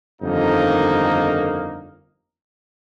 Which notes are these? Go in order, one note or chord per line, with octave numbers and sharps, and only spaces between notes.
G1 F2 D#3 A#3 D#4